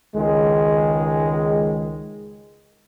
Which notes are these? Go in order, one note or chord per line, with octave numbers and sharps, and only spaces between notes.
C#2 D#3 G#3